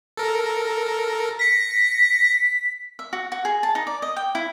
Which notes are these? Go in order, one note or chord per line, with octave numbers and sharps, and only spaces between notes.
A4 A#4
A#6 B6 C#7
E5
F#4
F#4
G#4
A5
D#4
D5
D#5
G5
E4